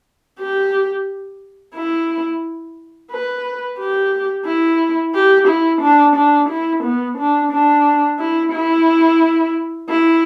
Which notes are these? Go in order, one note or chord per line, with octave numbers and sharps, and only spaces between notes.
G4
E4
B4
G4
E4
G4
E4
D4
D4
E4
B3
D4
D4
E4
E4
E4